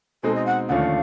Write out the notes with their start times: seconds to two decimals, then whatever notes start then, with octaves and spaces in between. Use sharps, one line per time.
0.23 B2 G#3 C4 D#4 A4
0.35 D#5
0.46 F#5
0.68 D#2 D3 F3 A3 C#4 F5 F#5